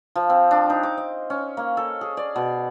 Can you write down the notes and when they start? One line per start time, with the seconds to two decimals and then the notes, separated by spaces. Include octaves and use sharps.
0.16 F3
0.30 C4
0.51 D4
0.70 D#4
0.83 D6
0.97 D#5
1.30 C#4
1.57 A#3
1.77 A4
2.01 G#4
2.17 D5
2.36 B2